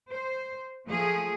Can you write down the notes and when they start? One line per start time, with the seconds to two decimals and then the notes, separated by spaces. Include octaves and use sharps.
0.11 C5
0.86 F3 A3 A#3 G#4